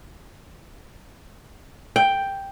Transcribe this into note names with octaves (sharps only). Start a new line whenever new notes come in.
G5